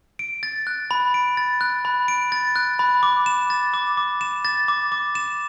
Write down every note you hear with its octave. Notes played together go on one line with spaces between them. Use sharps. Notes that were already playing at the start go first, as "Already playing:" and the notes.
D7
A6
F#6
B5
D7
A6
F#6
B5
D7
A6
F#6
B5
D6
E7
A6
D6
D6
E7
A6
D6
D6
E7